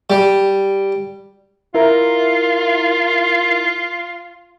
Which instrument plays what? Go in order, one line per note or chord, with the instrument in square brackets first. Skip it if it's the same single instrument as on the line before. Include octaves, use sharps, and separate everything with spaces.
[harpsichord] G3
[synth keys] E4 A#4 [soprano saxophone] F4